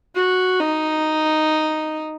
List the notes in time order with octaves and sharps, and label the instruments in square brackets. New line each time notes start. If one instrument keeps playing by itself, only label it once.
[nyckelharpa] F#4
D#4